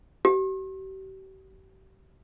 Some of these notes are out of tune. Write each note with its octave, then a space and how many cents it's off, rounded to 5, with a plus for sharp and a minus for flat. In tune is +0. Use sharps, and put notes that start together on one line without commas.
G4 -40